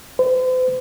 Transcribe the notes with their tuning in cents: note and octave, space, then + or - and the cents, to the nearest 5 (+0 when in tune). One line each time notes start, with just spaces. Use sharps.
C5 -45